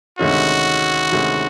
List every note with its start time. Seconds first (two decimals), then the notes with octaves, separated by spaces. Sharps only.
0.19 D2 C3 D#3 G#3 C#4 F#4
1.12 D2 C3 D#3 G#3 C#4